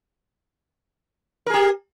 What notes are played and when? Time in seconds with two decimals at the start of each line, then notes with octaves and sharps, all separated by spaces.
1.46 A#4
1.50 G#4
1.54 G4